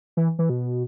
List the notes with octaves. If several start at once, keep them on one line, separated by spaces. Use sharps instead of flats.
E3
E3
B2